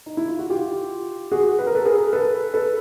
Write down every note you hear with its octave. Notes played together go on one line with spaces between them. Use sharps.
D#4
E4
F4
F#4
F4 G4
F#4 G#4
B4
A#4
A4 B4
G#4 A#4
A4 B4
A4 B4